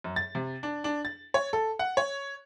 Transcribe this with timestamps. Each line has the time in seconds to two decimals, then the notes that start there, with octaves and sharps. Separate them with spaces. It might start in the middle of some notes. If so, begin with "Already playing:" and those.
0.04 F#2
0.16 A6
0.35 C3
0.63 D4
0.84 D4
1.05 A6
1.34 C#5
1.53 A4
1.79 F#5
1.97 C#5